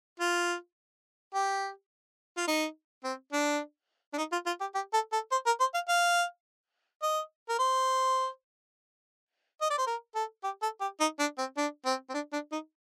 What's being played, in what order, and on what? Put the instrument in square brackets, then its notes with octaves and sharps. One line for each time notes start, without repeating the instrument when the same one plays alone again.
[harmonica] F4
G4
F4
D#4
C4
D4
D4
D#4
F4
F4
G4
G4
A4
A4
C5
A#4
C5
F5
F5
D#5
A#4
C5
D#5
D5
C5
A#4
A4
G4
A4
G4
D#4
D4
C4
D4
C4
C4
D4
D4
D#4